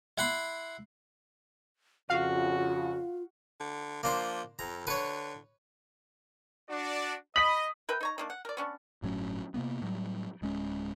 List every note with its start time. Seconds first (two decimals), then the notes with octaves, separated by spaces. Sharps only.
0.18 E4 F#5 B5 C6
2.10 F2 C#3 F4 F#4 F5
3.60 D3
4.03 F3 A#3 D4 C5
4.59 F2 A#5
4.87 D3 B4 C#5
6.70 D4 F#4 D5
7.36 D#5 B5 D#6 B6 F#7
7.89 A#4 B4 E5 G5
8.01 D#4 C#5 A#5
8.18 D#3 A#3 D4
8.30 F#5
8.45 A#4 D5
8.57 B3 C#4 D4
9.02 G1 A2 F#3 C#4
9.54 C3 F#3 A#3 B3
9.82 A2 F#3 G3
10.42 D1 G#3 C#4